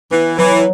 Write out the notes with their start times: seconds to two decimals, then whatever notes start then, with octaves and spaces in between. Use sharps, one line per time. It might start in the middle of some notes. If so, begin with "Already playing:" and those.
0.11 E3 B3
0.38 E3 F#3